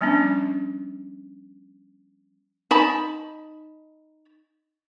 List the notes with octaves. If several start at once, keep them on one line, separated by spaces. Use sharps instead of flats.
F3 G3 B3 C#4 D4
D#4 A5 B5